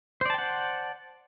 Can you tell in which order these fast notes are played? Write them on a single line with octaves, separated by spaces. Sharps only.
C5 D5 A5 G5 F#5